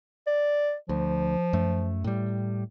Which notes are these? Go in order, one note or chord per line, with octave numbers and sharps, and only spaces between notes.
D5
D2 F3
F#2 A3
A2 G3